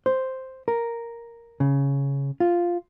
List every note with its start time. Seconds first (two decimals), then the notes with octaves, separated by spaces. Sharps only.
0.06 C5
0.68 A#4
1.60 C#3
2.40 F4